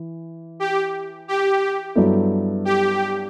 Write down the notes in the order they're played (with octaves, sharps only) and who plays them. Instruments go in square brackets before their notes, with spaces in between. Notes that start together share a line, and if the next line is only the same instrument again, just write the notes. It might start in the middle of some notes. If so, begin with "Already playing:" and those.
Already playing: [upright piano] E3
[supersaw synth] G4
G4
[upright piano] G2 F#3 B3 E4 A4
[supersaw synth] G4